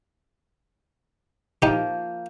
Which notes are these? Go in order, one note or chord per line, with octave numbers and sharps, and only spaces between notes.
F3 A#3 D#4 G4